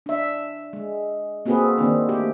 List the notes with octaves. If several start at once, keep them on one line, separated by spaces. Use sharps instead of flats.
D4 E5
G#3
A#3 C4 F#4 G#4 A4 B4
D#3 A#3 C4 D4
A3 G4